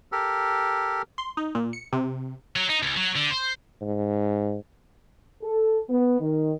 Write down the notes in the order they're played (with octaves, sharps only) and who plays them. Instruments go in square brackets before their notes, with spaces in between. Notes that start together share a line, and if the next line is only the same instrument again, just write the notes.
[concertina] G4 A4 A#4
[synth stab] C6
D#4
A#2
C#7
C3
[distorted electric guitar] F#3
D#4
C#2
F#3
D3
C5
[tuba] G#2
[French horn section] A4
B3
D#3